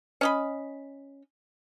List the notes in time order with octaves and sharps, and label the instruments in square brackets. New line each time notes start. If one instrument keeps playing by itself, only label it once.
[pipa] C#4 D#5 B5